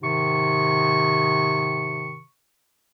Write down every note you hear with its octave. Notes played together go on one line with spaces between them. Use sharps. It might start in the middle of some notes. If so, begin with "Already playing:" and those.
G#2 C3 D#3 C#6